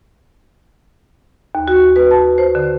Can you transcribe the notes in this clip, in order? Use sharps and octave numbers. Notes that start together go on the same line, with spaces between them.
D#2
F#4
B4
A5
C5
D3